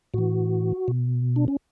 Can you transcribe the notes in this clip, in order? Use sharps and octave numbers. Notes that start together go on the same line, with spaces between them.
A2 E3 F#4
B2
D4
C#4